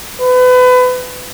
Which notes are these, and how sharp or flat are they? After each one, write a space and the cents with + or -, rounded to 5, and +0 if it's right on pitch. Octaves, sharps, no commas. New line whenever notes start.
B4 +30